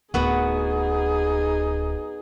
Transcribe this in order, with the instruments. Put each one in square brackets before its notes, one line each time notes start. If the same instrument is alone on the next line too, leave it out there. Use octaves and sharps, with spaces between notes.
[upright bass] D1 [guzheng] B3 F#4 [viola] D#4 G#4